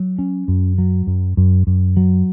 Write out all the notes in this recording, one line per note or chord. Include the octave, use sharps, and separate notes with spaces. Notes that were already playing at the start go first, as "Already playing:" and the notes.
Already playing: F#3
C#4
F#2
F#3
F#2
F#2
F#2
F#3